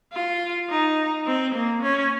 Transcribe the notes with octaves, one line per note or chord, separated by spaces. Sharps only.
F4
D#4
C4
A#3
C#4